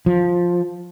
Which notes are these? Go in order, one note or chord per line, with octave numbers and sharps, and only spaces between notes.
F3